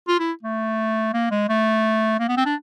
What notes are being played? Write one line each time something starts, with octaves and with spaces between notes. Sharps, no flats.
F4
E4
A3
A#3
G#3
A3
A#3
B3
C4
D4